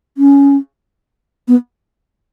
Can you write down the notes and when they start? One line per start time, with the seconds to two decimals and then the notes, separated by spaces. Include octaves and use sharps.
0.18 C#4
1.48 B3